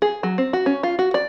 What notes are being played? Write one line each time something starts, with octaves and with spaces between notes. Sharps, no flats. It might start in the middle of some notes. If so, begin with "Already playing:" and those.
G#4
F#3
C4
F#4
C#4
F4
F#4
D5